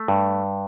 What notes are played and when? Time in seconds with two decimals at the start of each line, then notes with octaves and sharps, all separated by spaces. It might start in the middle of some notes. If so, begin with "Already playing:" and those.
Already playing: A3
0.08 G2